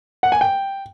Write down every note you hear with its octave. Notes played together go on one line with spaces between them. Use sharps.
F#5
G#5
G5